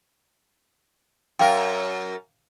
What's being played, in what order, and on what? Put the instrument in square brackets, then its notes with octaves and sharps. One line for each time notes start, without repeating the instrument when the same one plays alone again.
[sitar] F#2 A#4 [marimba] F5 G5